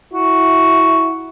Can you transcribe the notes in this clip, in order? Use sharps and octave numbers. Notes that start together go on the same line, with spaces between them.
E4 F#4